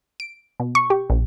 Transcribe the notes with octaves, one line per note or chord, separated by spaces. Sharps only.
D7
B2
C#6
G4
A#1